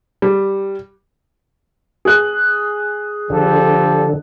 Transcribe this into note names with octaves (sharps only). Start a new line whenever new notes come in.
G3
G#4 F#6
D3 F3 G4 A4